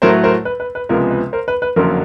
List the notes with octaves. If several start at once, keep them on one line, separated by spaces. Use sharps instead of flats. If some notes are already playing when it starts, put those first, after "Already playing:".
A2 F#3 A3 A#4 C5
A#4 C5
B4
B4
B4
C#2 C3 F3 G#3 B3 A#4
B4
A#4 C5
B4
B4
F#1 F2 D3 F#3 A#3 A#4